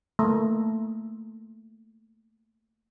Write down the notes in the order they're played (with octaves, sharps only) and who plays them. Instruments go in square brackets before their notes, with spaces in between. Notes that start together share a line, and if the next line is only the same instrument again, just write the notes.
[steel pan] A3 A#3